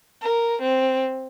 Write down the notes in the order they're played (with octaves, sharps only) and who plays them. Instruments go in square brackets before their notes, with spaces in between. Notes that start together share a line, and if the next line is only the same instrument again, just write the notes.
[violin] A#4
C4